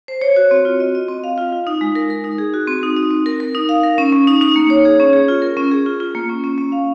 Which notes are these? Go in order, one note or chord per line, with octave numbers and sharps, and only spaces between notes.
C5
C#5
F#4
C4
F4
D#5
D#5
C4
F5
F4
F4
D#4
G#3
A#4
A#4
D#4
G#4
F#4
C4
D#4
D#4
C4
A#4
A#4
D#4
F5
A#4
C#4
C#4
D#4
D#4
A#3
C#5
G#4
C#4
G#4
F4
A#4
C#4
G#4
F4
F4
A#3
C#4
C#4
C#4
F5